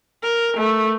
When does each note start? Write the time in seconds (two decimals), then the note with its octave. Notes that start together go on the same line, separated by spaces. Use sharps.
0.23 A#4
0.57 A3